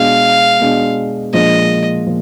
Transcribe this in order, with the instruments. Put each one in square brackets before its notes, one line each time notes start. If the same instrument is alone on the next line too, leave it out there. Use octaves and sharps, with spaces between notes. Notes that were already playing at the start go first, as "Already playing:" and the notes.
Already playing: [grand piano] B2 G#3 D4 [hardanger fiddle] F5
[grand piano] B2 G#3 D4
[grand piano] A#2 F3 G#3 D4 [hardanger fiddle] D#5
[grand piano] A#2 F3